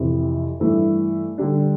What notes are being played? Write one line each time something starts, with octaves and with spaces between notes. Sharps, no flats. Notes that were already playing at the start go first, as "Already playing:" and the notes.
Already playing: F2 C3 E3
G2 E3 A3
D3 G3 D4